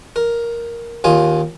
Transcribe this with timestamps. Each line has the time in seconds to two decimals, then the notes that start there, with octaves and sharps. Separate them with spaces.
0.16 A#4
1.04 D#2 F4 G#5